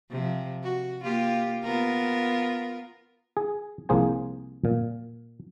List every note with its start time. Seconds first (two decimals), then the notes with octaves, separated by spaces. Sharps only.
0.10 C3 F3
0.63 F#4
1.03 A#3 F4 G4
1.63 B3 F4 A#4
3.37 G#4
3.89 C2 F3 A#3 G#4 C5 G#5
4.65 A#2